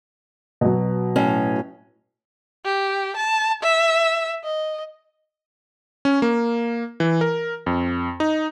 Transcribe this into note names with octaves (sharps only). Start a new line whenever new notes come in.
B2 F#3
A2 C#4
G4
A5
E5
D#5
C#4
A#3
E3
A#4
F2
D#4